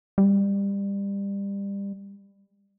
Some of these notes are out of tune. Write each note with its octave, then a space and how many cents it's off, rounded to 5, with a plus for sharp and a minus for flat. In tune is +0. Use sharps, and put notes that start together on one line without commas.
G3 +25